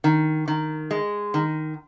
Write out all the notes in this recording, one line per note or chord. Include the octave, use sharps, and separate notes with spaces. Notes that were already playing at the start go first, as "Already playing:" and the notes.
D#3
D#3
G#3
D#3